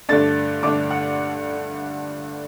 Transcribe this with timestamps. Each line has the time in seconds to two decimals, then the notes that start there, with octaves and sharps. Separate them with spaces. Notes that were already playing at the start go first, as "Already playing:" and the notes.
0.09 G2 D3 A3 D4 A6
0.63 G2 D3 A3 D4 D6
0.91 F#5